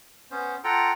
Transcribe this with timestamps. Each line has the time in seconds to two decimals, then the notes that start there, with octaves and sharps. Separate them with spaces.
0.31 B3 C#4 C5
0.64 F4 A4 F#5 G5 A#5